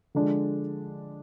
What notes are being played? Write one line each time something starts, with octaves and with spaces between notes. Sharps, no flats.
D3 F3 G#3 D4